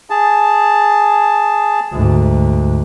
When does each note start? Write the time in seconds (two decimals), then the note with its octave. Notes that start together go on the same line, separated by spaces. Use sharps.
0.10 G#4 A5
1.93 D2 G#2